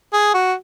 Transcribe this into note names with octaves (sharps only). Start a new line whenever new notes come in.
G#4
F#4